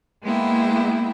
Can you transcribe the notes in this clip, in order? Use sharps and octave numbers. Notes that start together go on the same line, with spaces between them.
G#3 A#3 B3 E4 G5